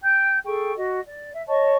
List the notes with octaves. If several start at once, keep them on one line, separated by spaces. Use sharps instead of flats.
G5 G6
G#4 A4 G5 C#6
F#4 D#5
D5
E5
C#5 D#5 A5 C#6